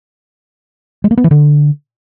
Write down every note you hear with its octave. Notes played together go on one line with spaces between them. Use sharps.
G#3
A#3
B3
E3
D3